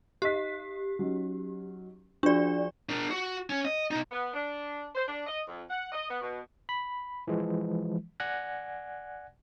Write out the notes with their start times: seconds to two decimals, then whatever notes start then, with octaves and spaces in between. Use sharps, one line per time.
0.22 D#4 G4 D#5 B6
0.99 F#3 C#4 D#4
2.23 F3 D4 F#4 G#4 D5
2.89 D4 A#4
3.11 F#4
3.50 C#4
3.65 D#5
3.91 B2 D#4
4.12 B3
4.34 D4
4.95 C5
5.08 D4
5.27 D#5
5.48 F2
5.70 F#5
5.92 D#5
6.09 B3
6.22 B2
6.69 B5
7.27 E3 F3 G#3
8.20 D5 F#5 G#5 F#6 G#6 A#6